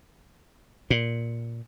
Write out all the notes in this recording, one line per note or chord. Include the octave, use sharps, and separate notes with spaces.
A#2